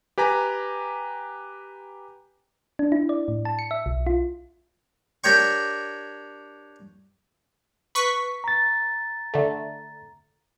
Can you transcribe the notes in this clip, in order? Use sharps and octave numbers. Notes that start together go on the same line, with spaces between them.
G4 B4 G#5 A#5
D4
E4
D5
A2
A5
C#7
E5
B1
F4
D4 G4 A#4 C#5 G5 C#6
B4 C#6 B6
A#5 A6
D3 A3